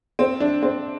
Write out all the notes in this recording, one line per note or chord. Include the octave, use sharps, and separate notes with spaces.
C4
D4
C4